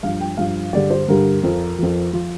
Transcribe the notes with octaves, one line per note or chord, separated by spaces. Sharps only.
G2 F3 F5
G5
G2 F3 F5
G2 D3 G3 D5
C5
G2 D3 G3 A#4
F2 F3
F2 F3
F3 F4